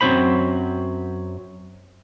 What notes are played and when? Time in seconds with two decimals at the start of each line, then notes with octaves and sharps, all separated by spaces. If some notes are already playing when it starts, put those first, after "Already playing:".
0.01 F#2 F#3 C4 D#4 C5 B5